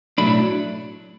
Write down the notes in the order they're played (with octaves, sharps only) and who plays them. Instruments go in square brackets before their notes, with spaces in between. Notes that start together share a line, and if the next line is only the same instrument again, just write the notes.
[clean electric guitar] B1 A2 F#3 A3 D4 B5